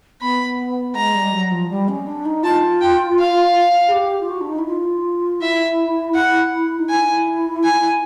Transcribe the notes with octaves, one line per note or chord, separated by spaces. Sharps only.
B3 B5
G#3 A#5
G3
F#3
F3
G3
C#4
D4
D#4
F4 A5
G5
F5
G#4
G4
F4
F#4
D4
D#4
E4
F4
E4 E5
F#5
D#4
E4 G#5
G#5